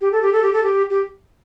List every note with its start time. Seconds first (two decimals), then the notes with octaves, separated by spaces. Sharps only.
0.01 G4
0.12 A4
0.22 G4
0.33 A4
0.42 G4
0.53 A4
0.63 G4
0.90 G4